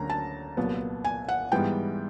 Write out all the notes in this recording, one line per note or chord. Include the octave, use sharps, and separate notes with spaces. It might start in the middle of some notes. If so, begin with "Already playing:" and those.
Already playing: D2 D3 F#3 A#3 C#4 A#5
A5
C2 A#2 F#3 B3
G#5
F#5
G#2 E3 G3 B3 G5